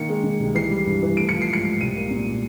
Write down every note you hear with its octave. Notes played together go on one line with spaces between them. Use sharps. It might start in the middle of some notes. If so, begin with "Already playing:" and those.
Already playing: D#3 A#3 C#7
G#3
D#3
C2
E3 C7
G3
G2
E3
A3 D7
C#7
F3
C7
G#2 C#7
G#2
C2 D#7
A#3
A#2